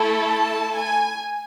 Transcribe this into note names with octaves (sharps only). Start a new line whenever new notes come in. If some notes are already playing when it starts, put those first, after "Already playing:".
Already playing: A3 E4 A4
A5
G#5